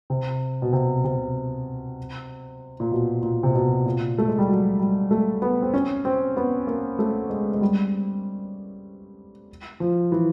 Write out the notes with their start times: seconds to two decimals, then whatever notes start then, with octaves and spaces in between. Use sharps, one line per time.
0.10 C3
0.62 B2
0.73 C3
1.04 C3
2.80 A#2
2.91 B2
3.23 A#2
3.43 C3
3.55 B2
3.86 A#2
4.18 A3
4.28 G#3
4.39 G3
4.48 F#3
4.79 G3
5.11 A3
5.42 B3
5.62 C4
5.74 C#4
6.05 C4
6.37 B3
6.67 A#3
6.99 A3
7.30 G#3
7.54 G#3
7.61 G3
9.80 F3
10.12 E3